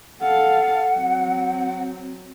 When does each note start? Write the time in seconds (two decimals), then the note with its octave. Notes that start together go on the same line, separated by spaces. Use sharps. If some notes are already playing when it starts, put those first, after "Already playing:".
0.20 A4 F5 F#5
0.96 F#3 C4